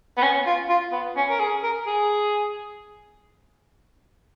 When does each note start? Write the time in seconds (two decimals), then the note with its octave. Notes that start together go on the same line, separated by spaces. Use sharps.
0.17 B3
0.22 C#4
0.46 F4
0.69 F4
0.92 B3
1.17 C#4
1.30 A#4
1.39 G#4
1.63 A#4
1.87 G#4